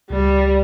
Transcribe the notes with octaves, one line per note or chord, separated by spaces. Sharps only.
C#2 G3